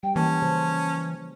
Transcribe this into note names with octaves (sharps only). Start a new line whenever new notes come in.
G3 G5
E3 A#3 C#4 A5
C#3 F3 C5